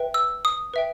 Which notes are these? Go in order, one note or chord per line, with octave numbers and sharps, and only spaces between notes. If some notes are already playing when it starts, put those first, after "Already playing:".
Already playing: B4 E5 G5
E6
D#6
B4 E5 G5